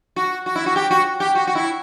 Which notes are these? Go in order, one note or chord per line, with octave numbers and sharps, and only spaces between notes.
F#4
F#4
E4
F#4
G4
F#4
G4
F#4
F#4
E4